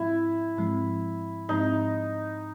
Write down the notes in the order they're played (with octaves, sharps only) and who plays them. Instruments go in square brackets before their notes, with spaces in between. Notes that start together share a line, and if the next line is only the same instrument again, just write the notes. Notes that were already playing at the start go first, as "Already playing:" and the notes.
Already playing: [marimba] G#2 F3 G#3 C4 [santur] E4
[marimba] G#2 F3 G#3 C4
[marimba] G#2 F3 G#3 C4 [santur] D#4